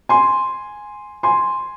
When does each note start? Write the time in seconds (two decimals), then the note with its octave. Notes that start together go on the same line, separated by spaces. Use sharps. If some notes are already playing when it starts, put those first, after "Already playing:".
0.09 G#5 C6
1.23 G#5 C6